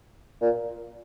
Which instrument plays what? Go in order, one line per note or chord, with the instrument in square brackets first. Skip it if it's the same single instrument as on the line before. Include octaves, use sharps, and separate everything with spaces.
[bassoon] A#2